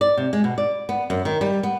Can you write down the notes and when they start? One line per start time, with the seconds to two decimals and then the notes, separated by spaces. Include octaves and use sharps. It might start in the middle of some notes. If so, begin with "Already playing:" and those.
0.01 D5
0.17 C3
0.33 G#3
0.44 B2
0.58 D5
0.89 B3
1.10 F#2
1.25 D#3
1.41 G3
1.63 B3